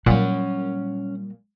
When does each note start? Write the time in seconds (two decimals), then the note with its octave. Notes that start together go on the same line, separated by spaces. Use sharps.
0.06 A#2 F#3 G3 C#4 F#5